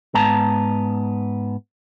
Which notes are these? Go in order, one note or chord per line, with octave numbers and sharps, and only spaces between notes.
G#2 B3 A5 A#5